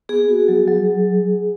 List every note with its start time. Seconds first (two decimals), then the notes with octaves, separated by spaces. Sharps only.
0.09 B3 G#4
0.28 F#4
0.48 F#3
0.68 F#3